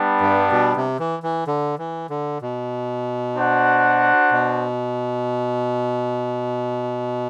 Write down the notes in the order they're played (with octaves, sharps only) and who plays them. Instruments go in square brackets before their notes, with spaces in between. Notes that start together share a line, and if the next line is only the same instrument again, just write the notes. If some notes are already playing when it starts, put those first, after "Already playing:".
Already playing: [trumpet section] G3 B3 D4
[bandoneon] G2
B2
C3
E3
E3
D3
E3
D3
B2
[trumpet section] D4 F#4 C5 F#5
[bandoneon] B2